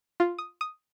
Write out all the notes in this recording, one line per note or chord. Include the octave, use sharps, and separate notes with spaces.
F4
D#6
D#6